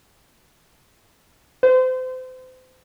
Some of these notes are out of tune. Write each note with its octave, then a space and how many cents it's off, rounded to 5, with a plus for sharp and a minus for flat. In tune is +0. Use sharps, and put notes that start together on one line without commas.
C5 -35